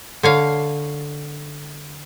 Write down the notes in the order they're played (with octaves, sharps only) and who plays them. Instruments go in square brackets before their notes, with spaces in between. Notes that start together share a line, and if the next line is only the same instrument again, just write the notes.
[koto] D3 C#5 F5